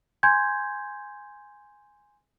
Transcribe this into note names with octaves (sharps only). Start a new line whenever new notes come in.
G#5 C6 G6 G#6